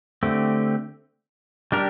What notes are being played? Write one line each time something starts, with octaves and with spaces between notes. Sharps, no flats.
D3 A3 C4 G4
G3 D4 G4 A#4